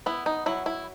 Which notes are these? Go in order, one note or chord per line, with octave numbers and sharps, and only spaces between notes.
B3 E4
D#4
F#3 E4
E4